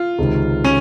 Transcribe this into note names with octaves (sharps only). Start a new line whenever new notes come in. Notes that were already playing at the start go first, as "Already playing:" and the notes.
Already playing: F4
C#2 C3 D#3
C#4